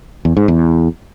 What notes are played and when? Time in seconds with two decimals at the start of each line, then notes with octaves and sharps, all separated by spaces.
0.25 E2
0.37 G#2
0.48 E2